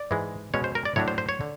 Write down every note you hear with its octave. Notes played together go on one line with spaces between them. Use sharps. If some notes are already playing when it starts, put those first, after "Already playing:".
Already playing: D5
G#2 E3 G#3
B2 G#3 C#4 C#5
C5
A#4
D5
A2 F#3 A3 D4 C#5
C5
C5
C#5
D3